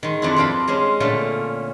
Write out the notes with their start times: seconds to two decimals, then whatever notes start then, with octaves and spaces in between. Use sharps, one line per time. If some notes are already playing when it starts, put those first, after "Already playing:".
0.03 D#3 G#3
0.22 F2 C4 D4 E4
0.36 G2 C4 D4 F5 B5
0.68 G#3 C#4 C5
1.00 A#2 D3 A3 C#4